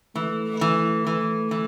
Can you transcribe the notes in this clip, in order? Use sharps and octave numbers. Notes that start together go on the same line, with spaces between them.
E3 A3
E3
E3
E3